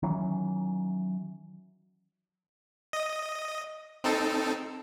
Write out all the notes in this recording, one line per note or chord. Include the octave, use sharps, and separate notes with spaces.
D#3 E3 F#3 C#4
D#5
C4 D#4 A4